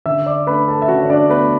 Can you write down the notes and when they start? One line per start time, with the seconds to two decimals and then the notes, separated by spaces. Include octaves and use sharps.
0.06 D3 E5 E6
0.26 D5 D6
0.47 A3 D4 B4 B5
0.68 A4 A5
0.82 E5
0.88 D3 F#4 F#5
1.01 C#5
1.10 D4 D5
1.30 A3 B3 D4 B4